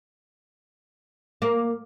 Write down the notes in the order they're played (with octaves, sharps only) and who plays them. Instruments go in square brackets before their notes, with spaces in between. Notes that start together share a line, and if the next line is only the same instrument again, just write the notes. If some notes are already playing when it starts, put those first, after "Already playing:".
[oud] A#3